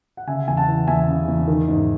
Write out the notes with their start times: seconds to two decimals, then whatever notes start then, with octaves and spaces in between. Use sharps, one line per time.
0.17 F#5
0.27 C#3 E5 G#5
0.48 E2 G#5
0.57 F#5 A5
0.68 E3
0.87 E2 E5 G#5
1.08 C#3
1.28 E2
1.48 D#3
1.68 G#2